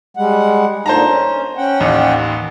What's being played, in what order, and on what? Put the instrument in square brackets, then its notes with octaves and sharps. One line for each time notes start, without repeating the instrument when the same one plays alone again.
[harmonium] G3 G#3 F#5
[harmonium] A#2 D3 D#4 [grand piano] C5 A5 A#5
[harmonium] C#4
C#4 F#5 G5
[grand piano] A1 D#2